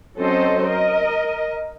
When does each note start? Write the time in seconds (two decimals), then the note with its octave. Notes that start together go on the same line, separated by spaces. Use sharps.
0.16 F#3 C4 C#4 A4 C5 D#5
0.66 A#4 D#5